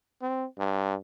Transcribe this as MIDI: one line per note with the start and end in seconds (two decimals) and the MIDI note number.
0.22 0.45 60
0.58 0.95 43